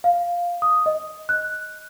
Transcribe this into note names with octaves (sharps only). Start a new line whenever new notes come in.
F5
D#6
D#5
F#6